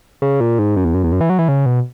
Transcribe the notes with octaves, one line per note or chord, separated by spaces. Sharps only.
C#3
A#2
G#2
F#2
E2
F#2
E2
F#2
E3
F#3
E3
C#3
B2